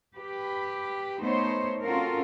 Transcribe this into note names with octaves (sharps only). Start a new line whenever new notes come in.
G4 B4
A3 B3 D#4 C5 C#5
C4 C#4 F4 F#4 A4 A#4